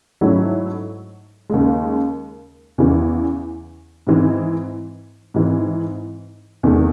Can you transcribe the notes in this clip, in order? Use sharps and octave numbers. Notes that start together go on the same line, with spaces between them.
G#2 F#3 A3 C#4 E4
D#2 C#3 G#3
E2 C#3 E3
G#2 E3 C4 D#4
G#2 E3 C4
E2 C3 D#3 A3